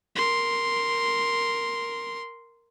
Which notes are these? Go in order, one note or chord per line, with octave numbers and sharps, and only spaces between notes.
A#4 C6